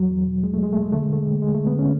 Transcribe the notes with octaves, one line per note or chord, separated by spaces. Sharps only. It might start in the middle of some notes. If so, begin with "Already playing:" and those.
Already playing: E2 F#3
E2
B2
E2 G#3
A3
E2 G#3
B2 A3
G#3
D3 A3
G#3
D3 A3
D3 G#3
D2 G#3
D3 A3
B3
D3 C#4